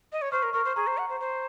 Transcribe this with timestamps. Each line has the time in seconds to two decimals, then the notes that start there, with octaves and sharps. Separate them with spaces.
0.12 D#5
0.22 C#5
0.32 C5 C#6 F6
0.43 A#4
0.53 A#4 C#6 F6
0.65 C5
0.76 G#4 A#5 C#6
0.87 C5
0.98 F#5
1.09 C5
1.20 C5